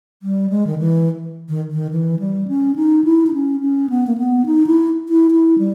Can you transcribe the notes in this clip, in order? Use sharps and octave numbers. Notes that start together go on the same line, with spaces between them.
G3
G#3
D#3
E3
D#3
D#3
E3
G3
C#4
D#4
E4
D#4
C#4
C#4
B3
A#3
B3
D#4
E4
E4
E4
G3